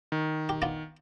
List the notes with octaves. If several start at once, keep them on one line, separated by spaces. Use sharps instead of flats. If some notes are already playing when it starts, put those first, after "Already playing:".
D#3
G4
B3 D4 F4